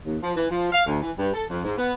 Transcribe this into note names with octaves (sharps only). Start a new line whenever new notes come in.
D#2
F3
E3
F3
F5
D2
E3
G2
A4
F2
G#2
B3